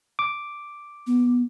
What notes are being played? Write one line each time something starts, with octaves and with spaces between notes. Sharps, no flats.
D6
B3